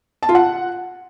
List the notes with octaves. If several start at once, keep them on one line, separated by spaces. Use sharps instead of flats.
A5
F4
F#5